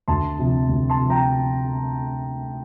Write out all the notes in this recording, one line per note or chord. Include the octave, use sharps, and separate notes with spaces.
D2 A5 C6
C3 F3
D2
A5 C6
C3 F3
G5 A#5